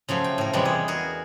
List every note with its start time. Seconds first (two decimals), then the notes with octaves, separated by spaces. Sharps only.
0.09 C#3 F3 F#3 A3
0.24 G5
0.38 A2 A#4
0.53 E2 C3 G3 G#3 G4 B4
0.65 B3 G#4
0.88 F#4 G#4 A#4